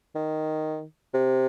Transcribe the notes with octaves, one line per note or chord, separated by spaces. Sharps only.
D#3
C3